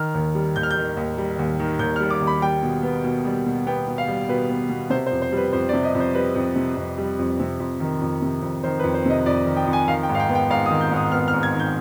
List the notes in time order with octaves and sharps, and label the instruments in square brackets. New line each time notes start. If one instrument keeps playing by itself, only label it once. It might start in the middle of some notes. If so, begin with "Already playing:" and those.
Already playing: [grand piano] D#3 F6
D#2
G3
D#2 G6
F6
G6
D#3
D#2
G3
D#2
D#3
D#2 G6
F6
G3
D6
D#2
B5
G3 G5
B2
B3
B2
G3
B2
B3 G5
B2
F5
G3
B2 B4
B3
B2
C3 C5
C5
F2
C5
G3
B4
F2 C5
D5
C3
D#5
F2
C5
G3 B4
F2
C3
F2
G3
F2
C3
F2
D#3
F2
C3
F2
D#3 C5
B4
F2
C5
C3 D#5
F2 D5
D#3
G5
F2
G#5
D#3 F5
G5
G#2
F5
G5
B3
G5
G#2 F5
D#6
D#3
G6
G#2 D#6
B3 F6
F6
G#2
G#6
D#3
G6